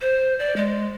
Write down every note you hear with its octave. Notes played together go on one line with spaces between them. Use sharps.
C5
D5
G#3